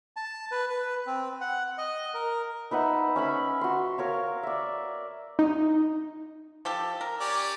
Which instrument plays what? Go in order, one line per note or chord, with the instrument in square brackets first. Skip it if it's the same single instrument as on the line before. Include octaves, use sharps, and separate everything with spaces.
[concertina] A5
B4
B4
C4
F#5
D#5
A#4
[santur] D#4 B4 E5 F#5
C#4 E5 B5 C#6
F#4 C6
A#4 C#5 F5
D5 E5
[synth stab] D#4
[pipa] F3 G4 A4
A#4
[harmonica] C#4 G4 D5